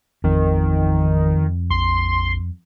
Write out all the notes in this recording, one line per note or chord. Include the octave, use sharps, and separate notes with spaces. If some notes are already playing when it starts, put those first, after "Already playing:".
A1 F2 D#3
A#1 C6